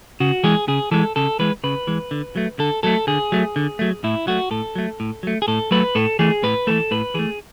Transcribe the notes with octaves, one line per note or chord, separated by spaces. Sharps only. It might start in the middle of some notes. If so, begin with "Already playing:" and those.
C#3 F#4
E3 G#3 G#4
C#3 G#4
E3 G#3 A4
C#3 A4
E3 G#3 B4
C#3 B4
E3 G#3
D3
F#3 A3
D3 A4
F#3 A3 A4
D3 G#4
F#3 A3
D3
F#3 A3
A2 E4
F#3 A3 F#4
A2 A4
F#3 A3
A2
F#3 A3
G#4
A2 A4
F#3 A3 B4
A2 A4
E3 A3 G#4
A2 B4
E3 A3 A4
A2 B4
E3 A3 G#4